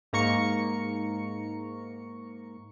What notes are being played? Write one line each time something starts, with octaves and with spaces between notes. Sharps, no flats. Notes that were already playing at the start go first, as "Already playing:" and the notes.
G#2 A#3 A#5 C#6 C#7